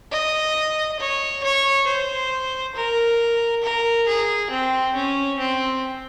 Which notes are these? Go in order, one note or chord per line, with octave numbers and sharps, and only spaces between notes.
D#5
C#5
C#5
C5
A#4
A#4
G#4
C4
C#4
C4